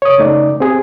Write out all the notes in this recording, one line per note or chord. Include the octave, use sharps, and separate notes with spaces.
C#5 D#6
C#3 A3 D#4 D5
C4 G4 G#4